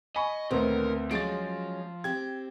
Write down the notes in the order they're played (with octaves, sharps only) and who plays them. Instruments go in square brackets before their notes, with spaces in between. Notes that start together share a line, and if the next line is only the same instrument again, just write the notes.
[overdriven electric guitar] D#5 [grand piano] G#5 B5 C#6
[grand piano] D2 B3 C4 [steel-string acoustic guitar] A#2 D3 D#3 [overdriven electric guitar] A#4
[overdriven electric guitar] F3 [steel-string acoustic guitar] F#3 G#3 C#4 [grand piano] A6 D7
[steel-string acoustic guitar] C4 G4 [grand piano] G#6